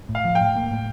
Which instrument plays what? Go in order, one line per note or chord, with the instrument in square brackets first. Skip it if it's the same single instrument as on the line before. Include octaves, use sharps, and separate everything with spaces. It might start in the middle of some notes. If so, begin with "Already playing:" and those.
[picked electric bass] A2
[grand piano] F5
[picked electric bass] F3
[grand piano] G5
[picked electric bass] A2
A#3
A2